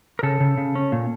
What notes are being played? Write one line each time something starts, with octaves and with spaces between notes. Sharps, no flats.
A#4
C#3 A4
C#3
C#3
C#4
A#2